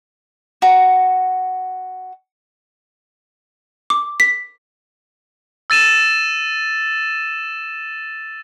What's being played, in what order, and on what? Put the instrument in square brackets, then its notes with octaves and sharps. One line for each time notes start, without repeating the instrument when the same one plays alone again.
[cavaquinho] F#4 A#5
[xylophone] D6
B6
[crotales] E6 A6 D#7 E7